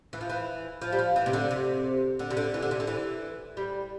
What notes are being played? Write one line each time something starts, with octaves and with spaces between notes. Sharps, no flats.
E3
F3
E3
F3
G3
F3
E3
C3
D3
C3
D3
C3
D3
E3
D3
C3
D3
E3
G3